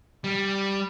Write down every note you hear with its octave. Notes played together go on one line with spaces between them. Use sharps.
G3